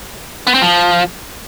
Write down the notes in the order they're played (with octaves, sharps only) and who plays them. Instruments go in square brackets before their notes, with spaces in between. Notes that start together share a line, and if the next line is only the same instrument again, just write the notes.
[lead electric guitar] B3
C4
F3